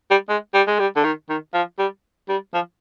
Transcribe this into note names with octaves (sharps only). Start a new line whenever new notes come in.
G3
G#3
G3
G#3
G3
D3
D#3
D#3
F3
G3
G3
F3